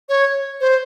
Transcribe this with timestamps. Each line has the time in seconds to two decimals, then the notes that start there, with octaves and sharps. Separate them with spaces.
0.09 C#5
0.61 C5